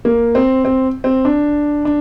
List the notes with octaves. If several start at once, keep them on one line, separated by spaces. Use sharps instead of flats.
A#3
C4
C4
C4
D4
D4